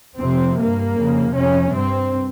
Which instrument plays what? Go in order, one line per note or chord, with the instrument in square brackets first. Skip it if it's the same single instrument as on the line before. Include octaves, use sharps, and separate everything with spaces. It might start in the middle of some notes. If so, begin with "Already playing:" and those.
[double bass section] F2 C3 C4
G2 A#3
F2 C#3
F2 C3 C#4
G2 C4